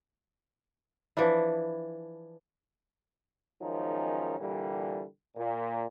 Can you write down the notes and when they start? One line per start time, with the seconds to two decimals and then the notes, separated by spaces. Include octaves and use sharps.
1.17 E3 F3 D4 E4
3.62 F#2 D#3 F3 G#3 C#4 D#4
4.40 A#2 D3 E3 G3
5.37 A#2